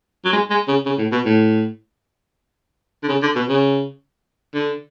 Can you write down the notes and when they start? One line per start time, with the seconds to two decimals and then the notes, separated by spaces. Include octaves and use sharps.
0.25 F#3
0.32 G#3
0.50 G#3
0.68 C#3
0.86 C#3
0.98 A2
1.12 B2
1.25 A2
3.03 D3
3.09 C#3
3.22 D3
3.35 B2
3.48 C#3
4.54 D3